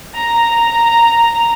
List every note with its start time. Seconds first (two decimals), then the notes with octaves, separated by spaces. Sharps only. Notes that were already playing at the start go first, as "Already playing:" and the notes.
0.15 A#5